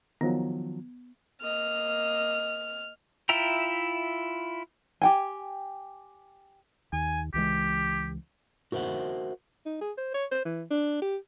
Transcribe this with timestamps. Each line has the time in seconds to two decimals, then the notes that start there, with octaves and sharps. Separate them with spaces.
0.21 D#3 F3 F#3 B3
1.42 A#3 D#5 F6
3.29 E4 F4 E5 G5 A#5
5.02 G4 G5 G#5
6.93 D#2 G#5
7.34 C#2 E3 G#3 G4
8.72 F#4 A#4 C5 E5 F#5
9.66 D#4
9.81 G#4
9.98 C5
10.14 C#5
10.32 C5
10.45 E3
10.71 D4
11.02 G4